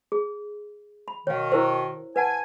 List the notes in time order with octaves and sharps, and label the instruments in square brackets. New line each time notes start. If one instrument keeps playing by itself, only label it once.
[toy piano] G#4
B5
[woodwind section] B2 D#3 [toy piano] C#5 F5
[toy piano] E4 A#4 C5
[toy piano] B4 F#5 A5 [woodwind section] G#5